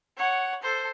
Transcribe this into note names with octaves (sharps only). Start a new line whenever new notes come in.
C#5 F#5
A4 C5